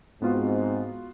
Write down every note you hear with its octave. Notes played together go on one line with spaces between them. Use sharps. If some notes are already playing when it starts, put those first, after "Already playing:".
G#2 B3 C4 F4 F#4